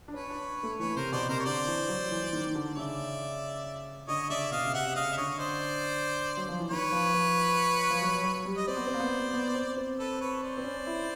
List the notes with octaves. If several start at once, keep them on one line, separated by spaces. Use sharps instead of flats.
D4
C#4 B4 C#5
D4
A3
E3 B4 C#5
C3 A#4 C5
B2 C5 D5
C3 A#4 C5
C#5
D3 C5 D5
E3
F#3
E3
E3
D#3
D#3
D3
C#3 D5 E5
D3 C#5 D#5
C#3 D5 E5
B2 D#5 F5
C#3
C3 E5 F#5
E5
C#3 D#5 F5
E5
D3 C#5 D#5
C5 D5
F#3
F3
E3
D#3 B4 C#5
F3
F3
F3
F#3
F#3
G3
D#5
C4 C5 D5
B3
C4
A#3
B3
B3
B3
C4
C4
A4 B4
B4 C#5
C5 D5
C4
C#4
E4